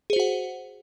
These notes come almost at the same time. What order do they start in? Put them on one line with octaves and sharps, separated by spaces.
G#4 C5 F#4 F#5